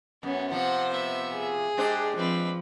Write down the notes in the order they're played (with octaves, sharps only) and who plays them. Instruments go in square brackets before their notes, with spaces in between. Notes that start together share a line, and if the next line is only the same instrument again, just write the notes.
[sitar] F#2 [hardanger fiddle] B3 C#4
[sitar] C3 F3 [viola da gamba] C5 [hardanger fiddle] F#5
[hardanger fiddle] B3 E5
[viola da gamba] G#4
[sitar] G#3 D4 C5 [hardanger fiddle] G4
[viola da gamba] F3 [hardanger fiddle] C4 B4